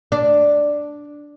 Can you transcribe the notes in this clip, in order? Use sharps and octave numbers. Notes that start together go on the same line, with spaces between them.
D4